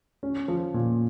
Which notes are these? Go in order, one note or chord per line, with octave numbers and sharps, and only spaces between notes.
C#4
F3
A#2